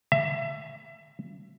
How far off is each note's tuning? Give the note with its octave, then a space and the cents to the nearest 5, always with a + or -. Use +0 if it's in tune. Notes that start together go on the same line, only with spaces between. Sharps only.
E5 +25